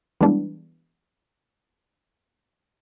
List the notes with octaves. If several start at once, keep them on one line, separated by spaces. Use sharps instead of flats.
E3 G3 G#3 B3 D4